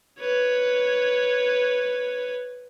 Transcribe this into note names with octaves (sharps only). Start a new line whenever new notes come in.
B4 C#5